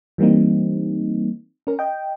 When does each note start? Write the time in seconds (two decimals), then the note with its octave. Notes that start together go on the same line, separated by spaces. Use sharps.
0.18 E3 G3 A#3 C4 D#4
1.67 C#4 A#4
1.79 D#5 G5